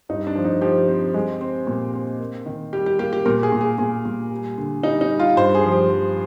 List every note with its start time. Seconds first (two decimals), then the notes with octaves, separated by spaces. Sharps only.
0.09 G2 D#4
0.27 D4
0.35 F3
0.45 D#4
0.61 F3 G4
0.88 C4
1.14 G#3
1.41 C4
1.67 A#2
1.94 C4
2.20 A#3
2.46 D#3
2.73 G3 G4
2.86 G4
2.99 A#3 G4
3.13 G4
3.25 A#2 A#4
3.43 G#4
3.52 A#2
3.61 G#4
3.78 A#2 G#4
4.05 A#2
4.31 G3
4.58 D3
4.83 G3 D#4
5.01 D#4
5.11 G3
5.20 F4
5.36 G2 C5
5.55 G#4
5.63 F3
5.72 G4
5.89 F3